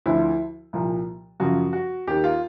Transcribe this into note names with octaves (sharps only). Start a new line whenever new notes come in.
D2 D3 F3 E4
C2 A#2 F3
F#2 C#3 F3 F#4
F#4
D#2 D#3 G4
F4